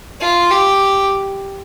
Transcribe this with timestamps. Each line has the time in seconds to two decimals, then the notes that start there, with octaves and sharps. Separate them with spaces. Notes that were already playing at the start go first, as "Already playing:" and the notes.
0.21 F4
0.51 G4